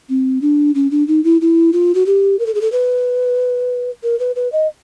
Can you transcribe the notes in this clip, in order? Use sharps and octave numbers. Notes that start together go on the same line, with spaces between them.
C4
D4
C#4
D4
D#4
E4
E4
F4
F#4
G4
A#4
A4
G#4
A4
B4
A#4
B4
B4
D#5